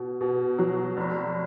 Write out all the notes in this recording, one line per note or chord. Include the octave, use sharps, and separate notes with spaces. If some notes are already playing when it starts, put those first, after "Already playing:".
Already playing: B2
B2
F#3
F1